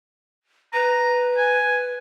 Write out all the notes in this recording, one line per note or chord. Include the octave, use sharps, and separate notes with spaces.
B4 A#5
G#5